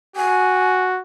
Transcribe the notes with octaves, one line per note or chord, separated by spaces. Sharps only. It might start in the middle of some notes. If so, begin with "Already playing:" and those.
F#4 G#5